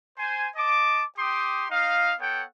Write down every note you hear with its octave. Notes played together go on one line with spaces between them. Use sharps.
C5 G#5
D#5 A5 D6
G4 G5 C6 D6 D#6
D#4 D#5 F5
B3 A4 C#5 F#5 G5